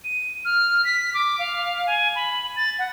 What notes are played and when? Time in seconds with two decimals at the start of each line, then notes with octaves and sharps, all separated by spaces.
0.04 D#7
0.45 F6
0.85 B6
1.14 D6
1.39 F5
1.86 G#5
2.15 B5
2.56 A6
2.79 F#5